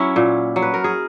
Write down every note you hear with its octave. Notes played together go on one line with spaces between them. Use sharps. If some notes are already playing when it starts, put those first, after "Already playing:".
Already playing: F#3 C#4 E4
A#2
F#3
B4
A#4
G#4